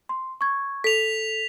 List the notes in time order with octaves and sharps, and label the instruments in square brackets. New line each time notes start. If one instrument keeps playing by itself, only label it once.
[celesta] C6
C#6 G#6
[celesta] A4 [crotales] B6 F7